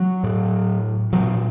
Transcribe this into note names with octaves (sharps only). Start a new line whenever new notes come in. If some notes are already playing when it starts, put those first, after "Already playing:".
Already playing: F#3
A2
A#2 F#3